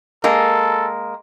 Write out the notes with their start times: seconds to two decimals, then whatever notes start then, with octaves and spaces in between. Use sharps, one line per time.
0.24 G#3 A#3 A4